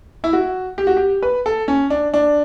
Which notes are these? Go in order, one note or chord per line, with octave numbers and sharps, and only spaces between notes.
E4
F#4
G4
F#4
G4
B4
A4
C#4
D4
D4